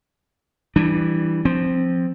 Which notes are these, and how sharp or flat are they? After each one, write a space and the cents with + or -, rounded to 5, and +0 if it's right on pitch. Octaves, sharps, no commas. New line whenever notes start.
E3 +5 G3 +0 D4 +25
F3 +0 C4 +0